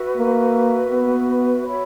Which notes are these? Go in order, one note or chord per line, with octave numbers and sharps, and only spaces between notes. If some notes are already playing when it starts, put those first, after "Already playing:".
Already playing: F#4 B4 E5
A#3
B3
F#4 C#5 E5 B5